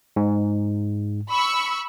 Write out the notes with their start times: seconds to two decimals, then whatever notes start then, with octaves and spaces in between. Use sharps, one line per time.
0.16 G#2
1.30 B5 C#6 E6